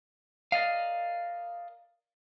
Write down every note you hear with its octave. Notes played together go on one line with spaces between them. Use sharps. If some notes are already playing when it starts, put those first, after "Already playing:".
A#4 D5 D#5 F5